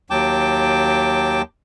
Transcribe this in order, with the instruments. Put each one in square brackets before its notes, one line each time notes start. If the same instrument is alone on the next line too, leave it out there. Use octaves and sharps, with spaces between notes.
[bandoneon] D#2 F#3 G5 A5 D6